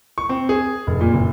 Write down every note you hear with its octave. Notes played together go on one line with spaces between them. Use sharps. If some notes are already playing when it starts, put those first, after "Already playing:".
C#6
C4
G#4
F1
A#2
F#1